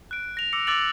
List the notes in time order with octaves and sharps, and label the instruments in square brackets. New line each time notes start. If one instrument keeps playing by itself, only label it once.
[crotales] F#6 D7
A#6 F7
D6 E6 A#6 C#7
D6 E6 F#6 A6 D7 F#7